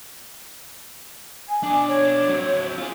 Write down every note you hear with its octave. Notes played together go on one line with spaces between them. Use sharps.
G#5
B2 D4
C#5
F#3 C4
F4 G#4